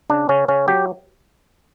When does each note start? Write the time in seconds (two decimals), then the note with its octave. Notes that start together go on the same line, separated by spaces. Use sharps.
0.10 C#3 D4
0.29 C#3 C#4
0.48 C#3 C#4
0.68 F#3 G4